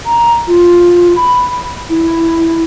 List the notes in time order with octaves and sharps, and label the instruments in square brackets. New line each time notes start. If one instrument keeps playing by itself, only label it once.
[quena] A#5
F4
B5
E4